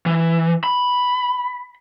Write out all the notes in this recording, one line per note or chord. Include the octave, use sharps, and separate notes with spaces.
E3
B5